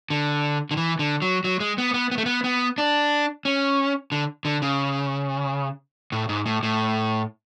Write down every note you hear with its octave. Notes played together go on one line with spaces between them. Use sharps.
D3
D3
E3
D3
F#3
F#3
G#3
B3
B3
B3
A3
B3
B3
D4
C#4
D3
D3
C#3
A2
G#2
A2
A2